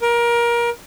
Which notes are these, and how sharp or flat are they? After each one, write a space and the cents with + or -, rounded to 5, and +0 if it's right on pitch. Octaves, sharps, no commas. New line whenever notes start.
A#4 +25